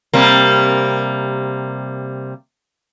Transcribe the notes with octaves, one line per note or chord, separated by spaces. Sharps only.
C3 G3 A#3